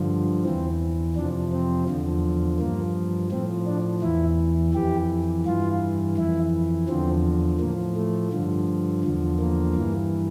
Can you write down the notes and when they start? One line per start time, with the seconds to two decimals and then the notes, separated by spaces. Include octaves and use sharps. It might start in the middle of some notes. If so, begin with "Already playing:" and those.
Already playing: G2 D3 F3
0.45 E2 E3 C4
1.16 F2 C3 F3 D4
1.52 C4
1.89 E2 D3 F3
2.59 G2 F3 A#3
3.31 A2 F3 C4
3.67 D4
4.02 E2 E3 E4
4.74 F2 E3 G4
5.46 G2 E3 F4
6.17 F2 E3 E4
6.88 E2 D3 F3 C4
7.60 A2 F3 A#3
7.96 A3
8.32 G2 D3 F3
9.04 E2 D3 F3
9.39 A#3
9.75 G2 E3